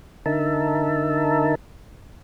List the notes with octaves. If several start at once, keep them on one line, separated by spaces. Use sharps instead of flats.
D3 D#4 A#4 E5 A5